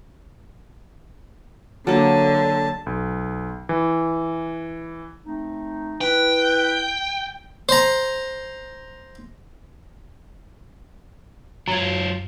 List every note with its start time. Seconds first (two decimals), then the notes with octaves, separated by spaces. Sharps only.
1.87 D3 F#3 A#3 A5
2.86 B1
3.69 E3
5.26 A3 C4 D#4
6.01 E4 B4 G5
7.69 C5 A#5
11.68 F#2 F#3 F4 G#6